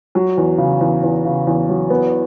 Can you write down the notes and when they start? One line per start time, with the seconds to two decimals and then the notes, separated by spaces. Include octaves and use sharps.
0.15 F#3
0.37 E2
0.58 C#3
0.81 E2
1.03 E2
1.25 C#3
1.47 E2
1.69 F#3
1.90 B3